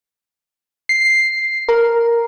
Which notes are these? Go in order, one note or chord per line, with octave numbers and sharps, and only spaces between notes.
C7
A#4